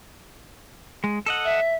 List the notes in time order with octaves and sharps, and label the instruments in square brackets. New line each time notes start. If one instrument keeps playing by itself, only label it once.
[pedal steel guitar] G#3
A4 D#5 F#5
[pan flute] E5